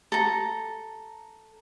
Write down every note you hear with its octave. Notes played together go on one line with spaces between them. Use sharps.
A4 A#5